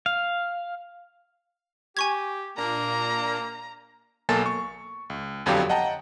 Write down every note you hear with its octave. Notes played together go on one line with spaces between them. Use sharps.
F5
G4 G#5 C#6 G#6
A#2 A#3 D4 A#5
B1 A#3 A4 G#5 A5 A6
C#6
C#2
G1 F2 D3 F#3 G4 F5
D#5 F#5 G5 A5 A#5